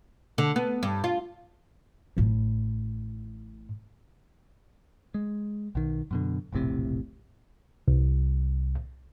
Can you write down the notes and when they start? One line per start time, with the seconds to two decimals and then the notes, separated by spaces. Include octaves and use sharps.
0.38 D3
0.56 B3
0.83 G2
1.04 F4
2.17 A1 A2
5.14 G#3
5.75 B1 D#3
6.11 F#2 B2 D3
6.53 E1 A#1 A2 C3
7.88 C2